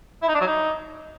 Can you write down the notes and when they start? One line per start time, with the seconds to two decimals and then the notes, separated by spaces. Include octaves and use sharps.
0.22 E4
0.28 D#4
0.34 D4
0.41 F#3
0.47 D#4